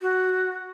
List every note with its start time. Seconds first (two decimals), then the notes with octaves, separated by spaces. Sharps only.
0.02 F#4